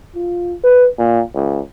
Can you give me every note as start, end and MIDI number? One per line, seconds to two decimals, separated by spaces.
0.15 0.53 65
0.63 0.87 71
0.98 1.20 46
1.35 1.60 37